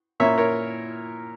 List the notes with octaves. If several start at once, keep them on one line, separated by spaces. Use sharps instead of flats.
A#2 A#3 C#4 E4 C#5 E5
A#4 C#5